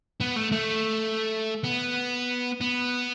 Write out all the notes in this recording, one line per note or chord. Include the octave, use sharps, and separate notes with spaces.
B3
A3
A3
B3
B3